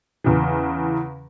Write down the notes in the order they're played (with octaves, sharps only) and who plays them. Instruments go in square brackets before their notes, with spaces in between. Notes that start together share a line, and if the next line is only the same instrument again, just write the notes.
[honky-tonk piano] E2 C#3 E3